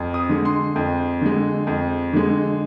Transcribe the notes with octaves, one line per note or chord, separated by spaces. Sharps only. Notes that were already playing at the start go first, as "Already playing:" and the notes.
Already playing: F2
D#6
D3 G#3
C6
F2
D3 G#3
F2
D3 G#3